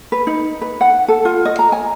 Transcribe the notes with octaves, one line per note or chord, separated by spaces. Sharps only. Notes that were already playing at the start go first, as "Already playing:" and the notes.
B4
D#4
B4
F#5
A4
F4
D#5
A#5
G#5